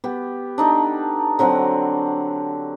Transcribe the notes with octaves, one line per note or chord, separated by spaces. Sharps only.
B3 G4
D4 D#4 A4
D3 F#3 C4 F#5